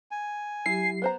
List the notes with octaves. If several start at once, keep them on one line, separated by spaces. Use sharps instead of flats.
G#5
F#3 E4 G4 C7
B3 C5 A#5